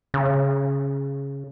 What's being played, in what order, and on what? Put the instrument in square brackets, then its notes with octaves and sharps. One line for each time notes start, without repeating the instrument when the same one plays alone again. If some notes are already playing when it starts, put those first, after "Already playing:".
[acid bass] C#3